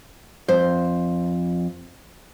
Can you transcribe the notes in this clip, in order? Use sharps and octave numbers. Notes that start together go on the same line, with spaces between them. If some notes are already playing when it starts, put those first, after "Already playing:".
F2 C5